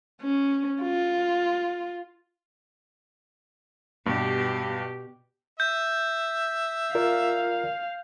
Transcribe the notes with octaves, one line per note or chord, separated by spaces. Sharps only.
C#4
F4
G2 B2 G4
E5 G6
F4 A#4 D5 F5